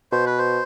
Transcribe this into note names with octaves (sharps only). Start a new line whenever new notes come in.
B2 C5
B4
C5